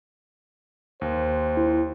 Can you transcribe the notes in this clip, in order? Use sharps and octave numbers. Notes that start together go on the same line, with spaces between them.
D#2 C5
E4